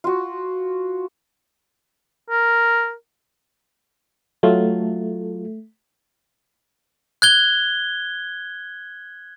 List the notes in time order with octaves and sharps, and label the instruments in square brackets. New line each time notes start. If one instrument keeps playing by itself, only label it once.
[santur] F4 F#4
[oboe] A#4
[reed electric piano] F#3 F4 [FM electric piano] A3
[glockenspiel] F#6 G#6 G7